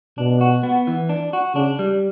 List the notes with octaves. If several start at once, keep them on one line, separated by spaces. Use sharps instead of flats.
B2 D4
F#4
B3
E3
D4
F#4
C#3 D4
G3